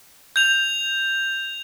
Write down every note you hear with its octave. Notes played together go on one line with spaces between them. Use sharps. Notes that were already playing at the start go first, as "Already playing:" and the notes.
G6 F7